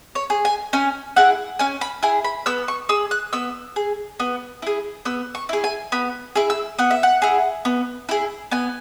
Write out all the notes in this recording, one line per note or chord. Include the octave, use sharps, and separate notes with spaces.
C#5
G#4
G#5
C#4 G#5
E4 G#4 F#5
C#4 G#5
B5
E4 G#4 G#5
B5
B3 E6
C#6
G#4 E6
F#6
B3 E6
G#4
B3
E4 G#4
B3 E6
C#6
E4 G#4
G#5
B3 B5
E4 G#4
E6
B3 F#5
E5
F#5
E4 G#4
B3
E4 G#4
B3 G#5